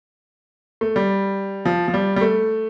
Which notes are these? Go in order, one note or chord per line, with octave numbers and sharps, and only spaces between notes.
A3
G3
F3
F3
G3
G3
A3